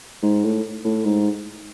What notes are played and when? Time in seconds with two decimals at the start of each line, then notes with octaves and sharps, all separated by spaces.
0.23 G#2
0.44 A2
0.84 A2
1.05 G#2